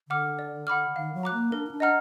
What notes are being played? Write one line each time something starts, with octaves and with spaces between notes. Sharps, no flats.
D3 F#5 D6 F6
D5
F#5 B5 D6 F6
D#3 F5
F#3
A#5 D6 F#6
A#3
D4 A#4
D#4
D4
D#5 F#5 A#5 F6